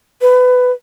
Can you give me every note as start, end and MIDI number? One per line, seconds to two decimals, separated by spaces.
0.22 0.71 71